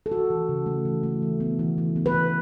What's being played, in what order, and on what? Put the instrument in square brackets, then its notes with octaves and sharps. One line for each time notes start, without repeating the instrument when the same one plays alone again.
[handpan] A4
E3 F#4
E3
C#3
A3
E3
A3
E3
B3
E3
E3
B3
B4
E3